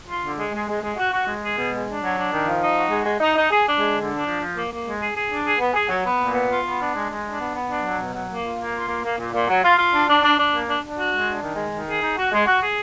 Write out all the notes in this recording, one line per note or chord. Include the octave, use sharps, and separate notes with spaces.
F4
D3
G#3
G#3
G#3
G#3
F#4
F#4
G#3
G#4
B2
G#3
D4
F#3
D4
D#3
F3
D#4
F#4
G#3
G#3
D#4
D#4
G#4
D4
G#3
D3
D4
F3
F3
A#3
A#3
G#3
G#4
G#4
D4
G#4
B3
G#4
F#3
B3
A#2
B3
F4
B3
D4
G#3
G#3
D4
B3
B3
D4
F#3
B2
F#3
A#3
F4
A#3
F4
A#3
A#3
A#2
A#2
F#3
F4
F4
D4
D4
D4
D4
A#3
D4
D4
F#4
G#3
D4
D#3
G#3
D#3
G#4
D#4
F#4
G#3
F#4
G#4